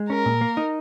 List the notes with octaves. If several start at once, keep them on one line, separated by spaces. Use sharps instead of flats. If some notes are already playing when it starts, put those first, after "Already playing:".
Already playing: G#3
C#4 A#4
A#2
A#3
D#4